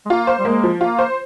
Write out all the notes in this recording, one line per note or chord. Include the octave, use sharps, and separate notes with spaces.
G#3
A#3 F4
C5
G3
G#3 A#3
F3
A#3 F4
C5